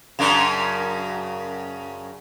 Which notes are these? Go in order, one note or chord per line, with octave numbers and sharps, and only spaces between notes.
F#2 C#3 D4